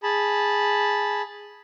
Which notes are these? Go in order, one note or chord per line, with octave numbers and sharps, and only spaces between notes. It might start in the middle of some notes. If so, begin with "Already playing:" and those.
G#4 A5 B5